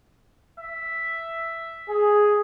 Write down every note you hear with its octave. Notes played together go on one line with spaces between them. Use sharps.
E5
G#4